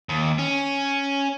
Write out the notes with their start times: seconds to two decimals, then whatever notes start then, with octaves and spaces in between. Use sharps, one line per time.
0.09 D#2
0.38 C#4